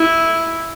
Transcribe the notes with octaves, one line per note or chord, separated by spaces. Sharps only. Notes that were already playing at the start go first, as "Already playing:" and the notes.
Already playing: E4